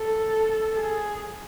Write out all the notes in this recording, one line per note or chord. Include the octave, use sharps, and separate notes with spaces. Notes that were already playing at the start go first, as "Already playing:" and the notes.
Already playing: A4
G#4